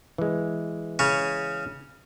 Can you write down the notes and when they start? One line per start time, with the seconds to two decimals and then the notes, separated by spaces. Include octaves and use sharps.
0.18 E3 G#3
0.99 C#3 C#4